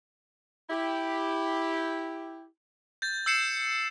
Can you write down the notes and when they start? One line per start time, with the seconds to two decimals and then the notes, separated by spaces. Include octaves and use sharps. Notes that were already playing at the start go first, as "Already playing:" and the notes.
0.70 E4 G4
3.02 G6 A6
3.26 E6 G6 C7 C#7 E7